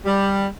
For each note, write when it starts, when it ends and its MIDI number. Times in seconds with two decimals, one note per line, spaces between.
0.06 0.46 55